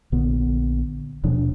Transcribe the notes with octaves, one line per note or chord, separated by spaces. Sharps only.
A#1 D3 B3
D#1 B2 F3 D4